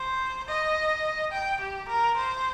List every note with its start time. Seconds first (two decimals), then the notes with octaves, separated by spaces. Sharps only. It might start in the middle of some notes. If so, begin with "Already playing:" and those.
Already playing: C5
0.48 D#5
1.32 G5
1.61 G4
1.88 A#4
2.16 C5